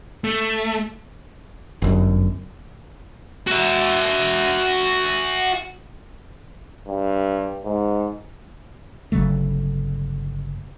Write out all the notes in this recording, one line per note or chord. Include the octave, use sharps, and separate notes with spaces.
A3
G1 F#2
F#4 E5
G2
G#2
G1 C#3 F#3 A3